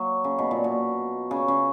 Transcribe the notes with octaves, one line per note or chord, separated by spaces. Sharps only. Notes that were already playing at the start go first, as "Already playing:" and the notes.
Already playing: F#3 A#3
C#3
B2
A#2
B2
C#3
C#3